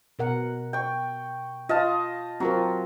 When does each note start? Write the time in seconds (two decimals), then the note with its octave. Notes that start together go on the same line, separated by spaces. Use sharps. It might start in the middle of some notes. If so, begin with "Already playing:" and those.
0.19 B2 A#4 F#5
0.73 G5 C#6
1.69 F4 D#5 F5 A5
2.40 F#3 C4 F4 A#4